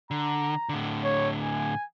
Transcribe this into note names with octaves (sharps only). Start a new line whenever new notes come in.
D3 A#5
A2 D3
C#5
G#5